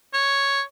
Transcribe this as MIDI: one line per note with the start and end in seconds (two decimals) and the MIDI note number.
0.14 0.62 73